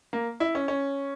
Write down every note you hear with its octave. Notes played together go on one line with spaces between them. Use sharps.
A#3
E4
C#4
C#4